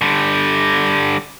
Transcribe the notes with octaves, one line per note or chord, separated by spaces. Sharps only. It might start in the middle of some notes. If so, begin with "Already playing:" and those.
D3 G3